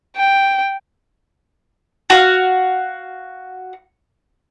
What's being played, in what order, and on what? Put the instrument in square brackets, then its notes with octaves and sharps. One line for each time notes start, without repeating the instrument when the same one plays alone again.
[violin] G5
[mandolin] F#4 F5